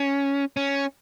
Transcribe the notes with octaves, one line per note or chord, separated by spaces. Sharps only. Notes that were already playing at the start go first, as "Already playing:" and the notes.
Already playing: C#4
C#4